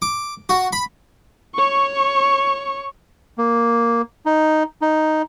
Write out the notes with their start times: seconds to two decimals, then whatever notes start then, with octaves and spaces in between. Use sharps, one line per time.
0.02 D6
0.49 F#4
0.73 B5
1.54 C#5 C#6
3.38 A#3
4.26 D#4
4.82 D#4